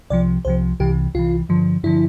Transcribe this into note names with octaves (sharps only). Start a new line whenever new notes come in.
C2 C3 F3 D5
C2 C3 F3 C5
C2 C3 E3 G4
C2 C3 E3 F4
G2 D3 F3
G2 D3 F3 E4